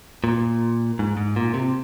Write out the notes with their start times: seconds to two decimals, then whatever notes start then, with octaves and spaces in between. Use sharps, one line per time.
0.24 A#2
0.99 G#2
1.17 G#2
1.36 A#2
1.54 C3